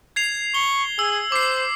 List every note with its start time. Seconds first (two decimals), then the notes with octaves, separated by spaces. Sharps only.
0.16 G#6 C7 F7
0.54 C#6 G7
0.99 G#4 E6
1.32 C5 D6 C7